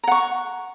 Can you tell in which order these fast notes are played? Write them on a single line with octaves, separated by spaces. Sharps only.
A#5 F#5 C#6